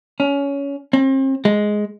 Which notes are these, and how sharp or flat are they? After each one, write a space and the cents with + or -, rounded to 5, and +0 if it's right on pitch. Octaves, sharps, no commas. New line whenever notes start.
C#4 +20
C4 +40
G#3 +5